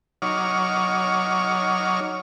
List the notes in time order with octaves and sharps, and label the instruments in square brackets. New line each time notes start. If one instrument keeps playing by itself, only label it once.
[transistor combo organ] F#3 D#4 C#5 D6 F6